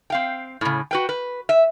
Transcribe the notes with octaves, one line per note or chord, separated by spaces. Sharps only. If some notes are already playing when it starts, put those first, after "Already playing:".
C4 F5 G5
A2 C#3
F#4 B4 G5
B4
E5